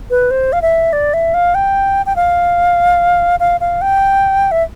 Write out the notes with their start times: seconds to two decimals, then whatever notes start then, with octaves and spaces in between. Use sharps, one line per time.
0.10 B4
0.31 C5
0.53 F5
0.62 E5
0.93 D5
1.14 E5
1.34 F5
1.55 G5
2.06 G5
2.16 F5
3.40 F5
3.61 F5
3.82 G5
4.51 E5